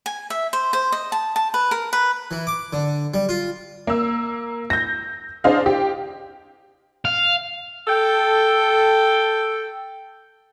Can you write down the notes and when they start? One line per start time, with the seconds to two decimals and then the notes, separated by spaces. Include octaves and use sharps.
0.06 G#5
0.30 E5
0.53 C5
0.73 C5
0.92 D#5
1.12 A5
1.36 A5
1.54 B4
1.71 A#4
1.93 B4
2.31 E3
2.47 D6
2.73 D3
3.14 G3
3.29 F4
3.87 A#3 E6
4.70 G6 A#6
5.44 D4 G#4 C5 D#5 F5
5.66 G4
7.05 F5
7.88 A4 G5